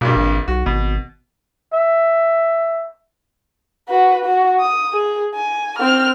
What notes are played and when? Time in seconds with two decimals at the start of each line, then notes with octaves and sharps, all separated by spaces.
0.01 A#1 G2 B2
0.16 G#1
0.48 B1 F#4
0.66 G#1 B2
1.73 E5
3.89 F#4 B4
4.25 F#4
4.59 D#6
4.93 G#4
5.35 G#5
5.79 C4 F6